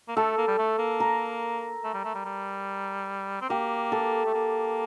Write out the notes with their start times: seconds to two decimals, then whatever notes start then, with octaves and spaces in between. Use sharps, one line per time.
0.08 A#3
0.17 A3 A4
0.38 A#3
0.48 G3
0.59 A3
0.79 A#3
1.00 A#4
1.84 A3
1.94 G3
2.05 A3
2.15 G3
2.25 G3
3.41 C4
3.50 A#3 G4
3.92 A4
4.26 A3
4.35 A#3